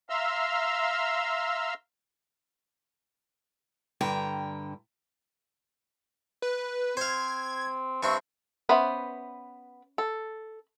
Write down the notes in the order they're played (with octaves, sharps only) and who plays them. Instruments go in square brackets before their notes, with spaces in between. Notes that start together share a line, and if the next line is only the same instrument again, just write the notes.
[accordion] E5 F5 A#5 C6 E6 F6
[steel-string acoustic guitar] G2 D3 G5 A#5
[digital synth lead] B4
[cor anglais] C4 [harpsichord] C5 F5 [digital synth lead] G#6
[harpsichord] G2 C4 [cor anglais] E5 [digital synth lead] C#6
[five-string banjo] B3 B4 C5 [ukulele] C#4 E5 B5
[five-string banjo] A4